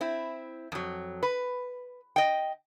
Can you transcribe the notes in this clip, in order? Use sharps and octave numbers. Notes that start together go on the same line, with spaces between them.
C4 E4
F2 F#3
B4
D#5 G5